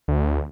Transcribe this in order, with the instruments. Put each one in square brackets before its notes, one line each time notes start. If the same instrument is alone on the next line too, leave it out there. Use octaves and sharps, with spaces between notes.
[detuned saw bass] D2